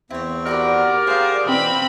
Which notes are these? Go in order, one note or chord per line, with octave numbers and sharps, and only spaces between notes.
E2 C4 E4 C#5
F#4 G4 A#4 D5 F#5 B5
E4 F4 G#4 C5 F5
B2 E3 C4 B5